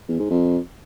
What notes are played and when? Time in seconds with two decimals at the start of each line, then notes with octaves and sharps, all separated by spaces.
0.08 E2
0.19 G#2
0.30 F2